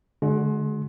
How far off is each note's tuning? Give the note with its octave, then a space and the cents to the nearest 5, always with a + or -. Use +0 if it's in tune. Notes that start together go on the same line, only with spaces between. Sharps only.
D3 +0 G#3 +35 F#4 +0